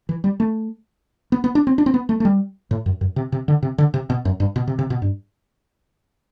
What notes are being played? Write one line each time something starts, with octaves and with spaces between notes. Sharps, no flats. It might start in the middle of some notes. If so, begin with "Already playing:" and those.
E3
G3
A3
B3
B3
D4
C4
D4
C4
B3
A3
A3
G3
A2
F#2
F#2
C3
C3
D3
C3
D3
C3
B2
F#2
G2
B2
C3
C3
B2
G2